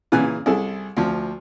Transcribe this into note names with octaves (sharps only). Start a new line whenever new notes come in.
A#2 C#3 E3 G#5 F#6
C2 E4 G#4 A4
D2 F3